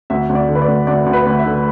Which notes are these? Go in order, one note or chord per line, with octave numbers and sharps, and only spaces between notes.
D2 E5
D2
D5
D3
B4
D5
D2
D2 D5
D2
B4
D2
E5
D3